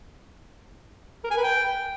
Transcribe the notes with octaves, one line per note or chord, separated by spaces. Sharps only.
A#4
G#5
B4
G5